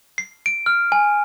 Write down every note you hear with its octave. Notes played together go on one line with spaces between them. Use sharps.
C7
D7
F6
G#5